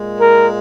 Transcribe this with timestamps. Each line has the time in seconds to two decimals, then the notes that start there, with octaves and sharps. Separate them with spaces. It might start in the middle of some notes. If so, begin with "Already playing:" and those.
Already playing: A#2 G#3
0.20 A#4